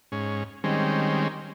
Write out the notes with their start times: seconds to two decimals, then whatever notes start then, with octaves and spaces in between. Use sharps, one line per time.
0.12 G#2 C#4
0.64 D#3 G3 G#3 C4 C#4